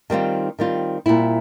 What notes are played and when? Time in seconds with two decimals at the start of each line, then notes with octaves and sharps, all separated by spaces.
0.10 D#3 G3 C4 F4
0.59 D#3 G3 C4 F4
1.06 A#2 G3 C4 E4